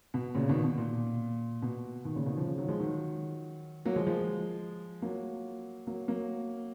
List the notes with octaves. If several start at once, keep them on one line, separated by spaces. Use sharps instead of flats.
B2
A#2 C#3
B2 D#3
B2
A#2
B2
B2 D#3
A#2 C#3
B2 D#3
C#3 F3
C#3 F3
D#3 F#3
F3 G#3
D#3 F#3
F#3 A#3
F3 G#3
F3 G#3
F#3 A#3
F#3 A#3
F#3 A#3